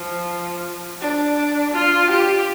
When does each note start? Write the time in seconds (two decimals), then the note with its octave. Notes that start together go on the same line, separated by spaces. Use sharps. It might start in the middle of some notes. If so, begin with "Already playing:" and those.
Already playing: F3
1.01 D4
1.74 F4
2.11 G4